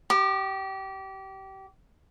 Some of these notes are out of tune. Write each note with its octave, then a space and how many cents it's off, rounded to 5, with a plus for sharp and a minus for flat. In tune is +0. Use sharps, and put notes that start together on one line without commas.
G4 -25 D6 +35